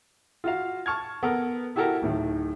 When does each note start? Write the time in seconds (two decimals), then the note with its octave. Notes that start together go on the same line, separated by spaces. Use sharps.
0.44 F4 F#4 F5
0.86 A5 C#6 F6 G#6
1.23 B3 A4 A#4
1.76 E4 F#4 G4 A4 A#4
2.02 D1 A2 D#3